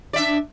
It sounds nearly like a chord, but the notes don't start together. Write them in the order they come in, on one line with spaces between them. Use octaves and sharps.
D5 E5 D4